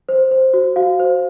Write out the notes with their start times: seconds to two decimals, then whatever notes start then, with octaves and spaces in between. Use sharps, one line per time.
0.09 C5
0.31 C5
0.54 F#4
0.76 F#4 F5
1.00 C5